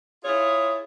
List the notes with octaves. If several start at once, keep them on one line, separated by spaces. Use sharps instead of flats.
E4 F4 G#4 C#5